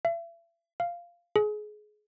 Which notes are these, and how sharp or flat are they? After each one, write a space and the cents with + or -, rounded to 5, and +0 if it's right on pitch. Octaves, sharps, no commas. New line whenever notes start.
E5 +40
F5 -10
G#4 +25